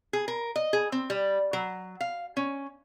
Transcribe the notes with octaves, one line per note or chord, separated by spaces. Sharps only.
G#4
A#4
D#5
G#4
C4
G3
F#3
F5
C#4